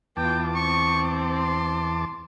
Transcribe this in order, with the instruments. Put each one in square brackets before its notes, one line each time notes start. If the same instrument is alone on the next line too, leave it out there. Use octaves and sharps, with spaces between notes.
[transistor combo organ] E2 A5 D6 [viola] B3 F4 [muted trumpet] G5
[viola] C4 [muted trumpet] C#6
[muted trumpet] C6